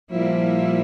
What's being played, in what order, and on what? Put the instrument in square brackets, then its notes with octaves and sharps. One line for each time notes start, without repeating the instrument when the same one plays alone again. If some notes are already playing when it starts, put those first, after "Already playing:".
[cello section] A#2 G3 A#3 E4 [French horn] F3